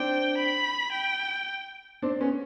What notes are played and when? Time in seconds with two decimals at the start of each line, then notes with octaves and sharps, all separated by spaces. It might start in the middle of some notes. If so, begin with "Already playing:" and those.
Already playing: C4 D4 G5
0.37 B5
0.92 G5
2.02 C4 D4
2.20 B3 C#4